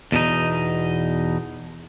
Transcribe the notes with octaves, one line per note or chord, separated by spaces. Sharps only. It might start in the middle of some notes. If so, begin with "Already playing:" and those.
E2 B2 D#4